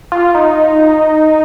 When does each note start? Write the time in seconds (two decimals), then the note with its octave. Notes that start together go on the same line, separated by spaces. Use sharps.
0.12 F4
0.35 D#4